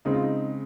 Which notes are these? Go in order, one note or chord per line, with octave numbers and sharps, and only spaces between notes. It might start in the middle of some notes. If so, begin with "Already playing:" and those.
C#3 G#3 C4 D#4
F4
D#4